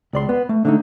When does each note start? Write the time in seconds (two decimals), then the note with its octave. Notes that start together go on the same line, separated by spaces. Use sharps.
0.13 C#2 D5 C6
0.29 B3
0.49 A3
0.65 D3 A3 D#4